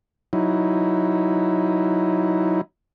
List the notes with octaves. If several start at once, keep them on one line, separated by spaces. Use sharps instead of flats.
F#3 D#4 E4